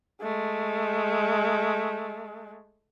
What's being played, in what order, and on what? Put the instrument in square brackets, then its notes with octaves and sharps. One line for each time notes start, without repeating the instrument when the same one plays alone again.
[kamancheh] G#3 A3